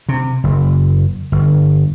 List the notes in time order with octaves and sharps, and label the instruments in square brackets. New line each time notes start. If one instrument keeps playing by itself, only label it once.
[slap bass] C3
F#1
G1